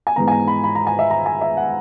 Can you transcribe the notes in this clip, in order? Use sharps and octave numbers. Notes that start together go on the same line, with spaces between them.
G#5
G#2 E3 B3 A#5
G#5
A#5
B5
B5
A#5
G#5
E5
A#5
G#5
E5
F#5